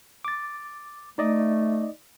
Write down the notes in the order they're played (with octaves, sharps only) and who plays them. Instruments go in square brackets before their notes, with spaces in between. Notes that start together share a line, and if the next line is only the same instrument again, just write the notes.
[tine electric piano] D6 A6
[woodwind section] A3 [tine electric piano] D#4 D5 D#5